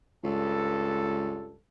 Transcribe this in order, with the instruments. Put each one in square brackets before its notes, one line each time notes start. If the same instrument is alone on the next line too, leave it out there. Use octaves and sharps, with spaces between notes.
[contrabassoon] C#2 [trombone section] G2 A4